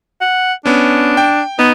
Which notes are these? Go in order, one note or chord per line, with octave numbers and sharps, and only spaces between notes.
F#5
B3 C#4 D4
G5
B3 D#4